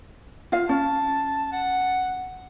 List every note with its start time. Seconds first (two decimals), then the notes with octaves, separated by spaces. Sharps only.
0.52 F4 F5
0.69 C#4 A5
1.52 F#5